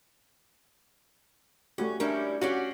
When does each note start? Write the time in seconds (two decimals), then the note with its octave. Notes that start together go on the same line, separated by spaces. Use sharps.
1.78 A3 C#4 F#4 G4
2.00 G3 C#4 D4 E4 A#4
2.41 C#4 F#4 G4 F5 F#5